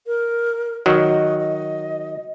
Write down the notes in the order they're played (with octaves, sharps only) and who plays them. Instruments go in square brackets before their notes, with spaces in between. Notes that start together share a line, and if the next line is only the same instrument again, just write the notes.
[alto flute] A#4
[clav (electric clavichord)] D#3 F#3 [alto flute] D#5
[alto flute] D#5